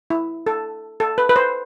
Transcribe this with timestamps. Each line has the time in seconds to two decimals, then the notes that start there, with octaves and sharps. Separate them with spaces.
0.10 E4
0.47 A4
1.00 A4
1.18 B4
1.29 B4
1.36 C5